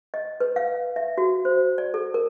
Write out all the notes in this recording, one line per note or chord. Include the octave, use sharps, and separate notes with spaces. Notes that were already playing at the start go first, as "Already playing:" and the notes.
D#5
B4
F5
E5
F#4
C5
D5
A4
A#4